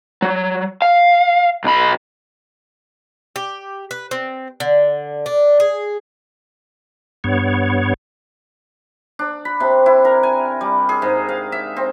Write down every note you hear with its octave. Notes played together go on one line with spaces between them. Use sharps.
F#3
F5
B1 B5
G4
B4
C4
D3
D4
G#4
G2 B3 C#5
D4
B5
C3
E4
A#4
G#5
G3
G#4
G#2
F5
E5
C4